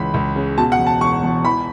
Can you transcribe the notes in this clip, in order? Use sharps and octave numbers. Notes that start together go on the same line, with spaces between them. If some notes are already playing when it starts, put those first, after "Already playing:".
Already playing: C#2 E3 B5
C#2
C#3
B2 A5
F#5
E1
A5
E1 C#6
E2
E3 B5